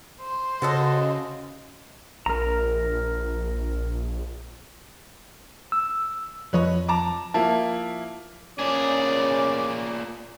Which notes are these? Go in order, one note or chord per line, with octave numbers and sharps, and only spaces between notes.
C5
C#3 F#4 A4 D#5
A#1 A#4 A#5
E6
F2 F3 B4 C#5 D#5
A5 A#5 D6
F3 A#3 E4 A5
A#2 C#4 G#4 D5